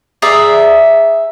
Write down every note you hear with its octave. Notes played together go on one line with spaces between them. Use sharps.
G#4 D5 E5 A#5